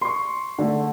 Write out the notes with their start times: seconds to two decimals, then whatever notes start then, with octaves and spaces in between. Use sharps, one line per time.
0.01 C6 C#6
0.58 D3 A3